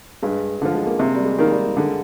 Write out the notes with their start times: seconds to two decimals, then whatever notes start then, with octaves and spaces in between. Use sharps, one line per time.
0.22 G2 G#3
0.62 D3 F3
0.75 G#3
0.86 A#3
0.99 C3 C4
1.15 G3
1.25 G#3
1.38 D#3 A#3
1.51 G3
1.77 D3 G#3